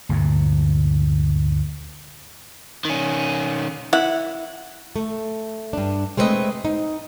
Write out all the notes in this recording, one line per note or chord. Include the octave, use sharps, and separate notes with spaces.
D2 G2 A#2
D#3 C#4
E4 F#5
A3
G2 D4
G#3 A3 C4 G#4 B4 D#5
D#4